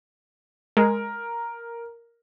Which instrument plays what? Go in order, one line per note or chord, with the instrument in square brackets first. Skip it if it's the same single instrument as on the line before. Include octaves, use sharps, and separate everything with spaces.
[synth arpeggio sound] G#3 [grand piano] A#4